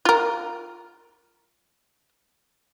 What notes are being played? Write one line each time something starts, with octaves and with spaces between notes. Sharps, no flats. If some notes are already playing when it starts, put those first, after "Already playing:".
F4 A#4